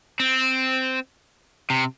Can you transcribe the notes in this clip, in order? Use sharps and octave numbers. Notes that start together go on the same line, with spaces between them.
C4
C3